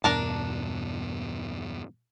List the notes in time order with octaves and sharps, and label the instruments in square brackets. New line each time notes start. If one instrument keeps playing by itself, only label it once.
[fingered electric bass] E2 G2 B2 [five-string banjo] D4 A#4 A5